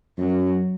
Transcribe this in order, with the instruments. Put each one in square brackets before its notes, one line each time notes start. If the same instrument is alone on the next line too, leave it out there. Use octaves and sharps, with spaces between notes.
[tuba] F#2 [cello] F#3